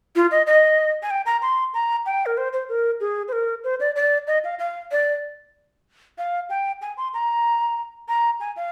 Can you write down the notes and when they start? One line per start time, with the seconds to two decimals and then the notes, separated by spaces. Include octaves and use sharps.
0.16 F4
0.31 D#5
0.47 D#5
1.03 G#5
1.10 G5
1.26 A#5
1.42 C6
1.74 A#5
2.06 G5
2.26 A#4
2.37 C5
2.53 C5
2.69 A#4
3.00 G#4
3.28 C5
3.32 A#4
3.64 C5
3.80 D5
3.96 D5
4.27 D#5
4.44 F5
4.59 F5
4.91 D5
6.18 F5
6.50 G5
6.82 G#5
6.97 C6
7.14 A#5
8.08 A#5
8.40 G#5
8.56 F5